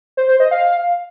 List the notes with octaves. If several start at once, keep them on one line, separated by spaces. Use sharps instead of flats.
C5
C5
D#5
F5